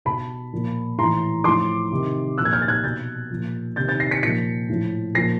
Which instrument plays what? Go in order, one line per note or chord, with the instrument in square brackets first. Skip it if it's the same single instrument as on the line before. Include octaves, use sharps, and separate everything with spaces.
[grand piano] B2 A5 B5
A#2 F3
A2 E3 A#5 C6
A2 F3 C6 D6
C3 D#3
A#2 F3 E6 F#6
G#6
F6 G6
A6
F#6 G#6
B2 G6 A6
A#2 F3
C3 G6 A6
D#3
G6 A6
A#6 C7
B6 C#7
A#2 F3 B6 C#7
A2 F3
A#2 F3 A#6 C7